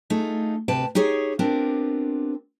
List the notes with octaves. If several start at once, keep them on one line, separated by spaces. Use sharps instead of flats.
A3 D#4 F4 G#4
D2 C3 B4 G5 A5
D#4 G4 G#4 C#5
B3 C4 D4 F4 G4 A#4